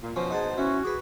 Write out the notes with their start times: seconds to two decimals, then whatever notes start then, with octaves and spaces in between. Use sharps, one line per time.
0.01 A#2
0.16 B2 F3 C#4 B4 C5
0.31 D#4 G#4 F#5 A5
0.58 C#4 E4 F#4
0.85 G#4 B4 D6